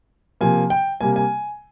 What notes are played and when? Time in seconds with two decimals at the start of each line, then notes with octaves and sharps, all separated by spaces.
0.41 C3 F3 A#3 G#5
0.70 G5
1.01 C3 G3 A#3 G#5
1.16 G#5